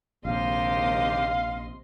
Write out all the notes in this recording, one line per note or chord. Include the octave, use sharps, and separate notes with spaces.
A#1 D#2 G#2 C3 G4 D#5 F5 C6